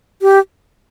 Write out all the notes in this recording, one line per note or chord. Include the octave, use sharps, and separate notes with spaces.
G4